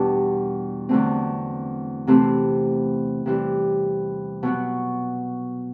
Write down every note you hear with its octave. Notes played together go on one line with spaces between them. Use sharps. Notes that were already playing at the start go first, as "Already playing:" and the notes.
Already playing: E2 B2 G3 D4
E2 D3 F#3 A3 C4
C3 E3 A3 C4
C3 E3 G3
B2 F#3 B3